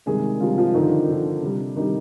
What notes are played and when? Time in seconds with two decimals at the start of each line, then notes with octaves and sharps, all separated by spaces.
0.06 C3 D#3 G3 G#3 G#4
0.40 C3 D#3 F3 G3 F4
0.58 F3 F4
0.74 D3 D#3 F3 D#4
0.92 D4
1.09 D3 F3
1.42 C3 G3
1.76 C3 D#3 G3 D#4